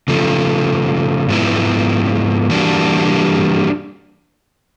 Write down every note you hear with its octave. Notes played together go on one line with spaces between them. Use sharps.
C#3 F3 A3
G#2 F3 G#3 B3 E4
E3 G3 A#3 D4 F#4